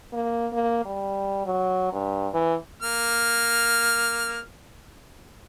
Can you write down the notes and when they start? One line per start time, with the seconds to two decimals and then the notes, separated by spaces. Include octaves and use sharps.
0.13 A#3
0.53 A#3
0.85 G3
1.46 F#3
1.92 G2
2.34 E3
2.82 A#3 F6